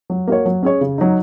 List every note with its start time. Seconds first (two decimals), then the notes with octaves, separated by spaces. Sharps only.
0.10 F#3
0.27 A#3 F#4 C#5
0.45 F#3
0.63 C#4 G#4 C#5
0.81 C#3
0.98 F#3 D#4